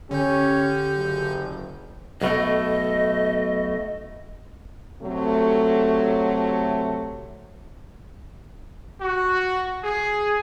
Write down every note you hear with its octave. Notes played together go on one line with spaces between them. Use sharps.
D3 C#4 G4 G6
F#1
B1 B2 A3 D#5
C3 F#3 A3
F#4
G#4